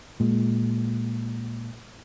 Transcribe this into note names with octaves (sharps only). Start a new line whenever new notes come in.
A#2 G#3